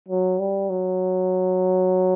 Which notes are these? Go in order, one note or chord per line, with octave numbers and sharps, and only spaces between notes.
F#3
G3
F#3